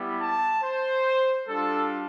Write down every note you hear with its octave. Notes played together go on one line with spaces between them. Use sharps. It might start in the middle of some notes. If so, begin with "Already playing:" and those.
Already playing: G3 B3 E4 G4
A5
C5
G3 D4 F4 A4